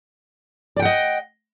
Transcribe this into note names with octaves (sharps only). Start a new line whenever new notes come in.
D5 D#5 F#5 G5